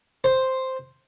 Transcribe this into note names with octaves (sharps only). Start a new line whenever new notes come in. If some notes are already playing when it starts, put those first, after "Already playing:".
C5